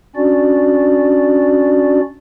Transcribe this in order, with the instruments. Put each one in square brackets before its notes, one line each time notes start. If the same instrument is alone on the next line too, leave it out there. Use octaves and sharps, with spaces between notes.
[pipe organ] C#4 D4 F#4 D5